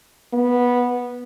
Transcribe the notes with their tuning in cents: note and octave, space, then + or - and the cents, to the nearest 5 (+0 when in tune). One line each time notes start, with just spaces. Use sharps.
B3 -10